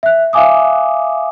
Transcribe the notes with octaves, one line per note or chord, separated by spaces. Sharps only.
E5 F#6
E5 F5 G#5 D6 D#6